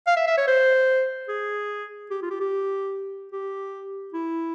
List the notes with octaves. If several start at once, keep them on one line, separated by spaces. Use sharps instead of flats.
F5
E5
E5
C#5
C5
G#4
G4
F4
G4
G4
G4
E4